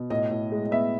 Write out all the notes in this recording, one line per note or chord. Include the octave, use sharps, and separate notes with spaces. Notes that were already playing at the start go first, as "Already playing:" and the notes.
Already playing: B2
A2 D#5
A2
G#3
D#5
B3 E5